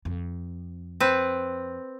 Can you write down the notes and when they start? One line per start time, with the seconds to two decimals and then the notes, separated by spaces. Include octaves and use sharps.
0.05 F2
1.00 C4 B4